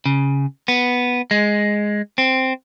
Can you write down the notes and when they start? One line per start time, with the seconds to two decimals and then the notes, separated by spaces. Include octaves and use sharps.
0.06 C#3
0.68 B3
1.31 G#3
2.18 C4